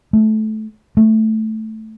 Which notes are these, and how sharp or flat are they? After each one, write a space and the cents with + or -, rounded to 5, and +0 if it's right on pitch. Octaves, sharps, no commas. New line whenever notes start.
A3 -20
A3 +0